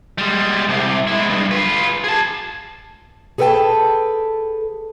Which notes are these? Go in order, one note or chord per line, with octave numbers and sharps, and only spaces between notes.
G3 G#3
C2 C3
G#3 E4
G2
F4 B4
G#4 A5
G#4 A4 B4 C5 G5 A5